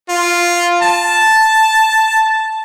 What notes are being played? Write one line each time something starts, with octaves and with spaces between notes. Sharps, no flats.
F4
A5